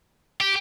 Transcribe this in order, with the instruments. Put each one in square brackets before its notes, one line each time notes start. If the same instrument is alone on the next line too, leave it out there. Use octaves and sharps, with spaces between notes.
[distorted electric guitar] G4